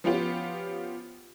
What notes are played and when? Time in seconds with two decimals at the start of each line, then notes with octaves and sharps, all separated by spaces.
0.04 F3 B3 C#4 F4 G4